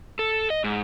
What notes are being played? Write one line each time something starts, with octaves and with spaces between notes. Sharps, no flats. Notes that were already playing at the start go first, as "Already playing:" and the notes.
A4
D#5
G#2